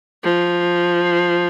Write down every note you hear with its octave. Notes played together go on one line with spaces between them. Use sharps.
F3